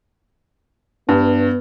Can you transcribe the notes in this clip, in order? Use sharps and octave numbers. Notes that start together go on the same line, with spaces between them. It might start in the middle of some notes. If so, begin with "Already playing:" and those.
G2 B3